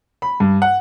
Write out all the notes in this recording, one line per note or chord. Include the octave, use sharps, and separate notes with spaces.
B5
G2
F#5